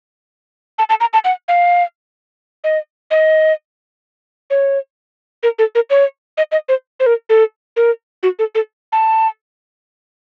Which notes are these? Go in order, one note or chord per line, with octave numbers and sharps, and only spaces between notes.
A5
A5
A#5
A5
F#5
F5
D#5
D#5
C#5
A#4
A4
A#4
C#5
D#5
D#5
C5
C5
A#4
A4
A#4
F#4
A4
A4
A5